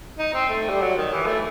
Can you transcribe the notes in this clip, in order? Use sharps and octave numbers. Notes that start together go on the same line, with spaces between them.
D#4
C4
A3
G3
F#3
D#3
E3
A3